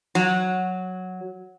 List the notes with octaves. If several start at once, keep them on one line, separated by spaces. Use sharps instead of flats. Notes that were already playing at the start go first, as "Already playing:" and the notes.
F#3